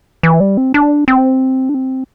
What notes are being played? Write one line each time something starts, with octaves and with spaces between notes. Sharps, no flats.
E3
G3
C4
D4
C4
D4
C4